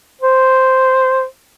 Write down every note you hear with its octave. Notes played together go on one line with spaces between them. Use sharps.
C5